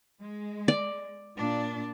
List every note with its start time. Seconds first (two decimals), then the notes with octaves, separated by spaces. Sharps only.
0.21 G#3
0.68 D5
1.36 A#2 D4